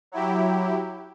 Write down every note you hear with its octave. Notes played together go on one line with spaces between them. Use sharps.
F#3 E4 G4